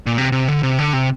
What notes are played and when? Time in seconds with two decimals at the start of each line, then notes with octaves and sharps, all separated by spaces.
0.06 A#2
0.18 C3
0.32 C3
0.48 D3
0.63 C3
0.79 D3
0.93 C3